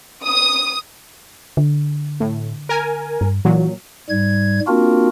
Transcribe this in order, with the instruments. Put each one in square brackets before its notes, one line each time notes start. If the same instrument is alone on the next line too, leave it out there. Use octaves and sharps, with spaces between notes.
[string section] D#6
[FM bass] D3
[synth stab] A2
A#4 G#5
[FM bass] G2
[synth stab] A#2 F#3 [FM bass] E3
[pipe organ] G#2 G3 G#6
A#3 C4 D4 F4 F#4 A#4